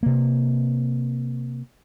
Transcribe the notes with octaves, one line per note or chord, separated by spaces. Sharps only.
C3 A#3